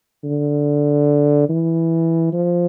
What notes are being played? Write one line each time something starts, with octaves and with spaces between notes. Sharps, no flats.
D3
E3
F3